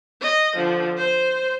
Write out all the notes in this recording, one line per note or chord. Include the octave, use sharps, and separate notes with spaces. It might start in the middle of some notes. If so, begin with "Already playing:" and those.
D#5
D3 F3
C5